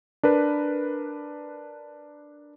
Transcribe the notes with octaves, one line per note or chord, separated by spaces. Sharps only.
D4 A#4 B4